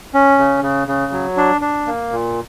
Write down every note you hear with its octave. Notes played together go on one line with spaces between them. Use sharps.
C#4
C#3
C#3
C#3
F#3
D4
D4
A#3
A#2